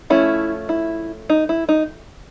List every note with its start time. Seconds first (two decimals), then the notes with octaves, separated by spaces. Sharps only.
0.10 F3 A3 C#4 E4
0.69 E4
1.30 D#4
1.49 E4
1.69 D#4